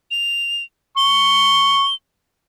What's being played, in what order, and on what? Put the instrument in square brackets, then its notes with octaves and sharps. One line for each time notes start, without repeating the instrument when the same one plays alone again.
[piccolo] F7
[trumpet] C#6 [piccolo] G7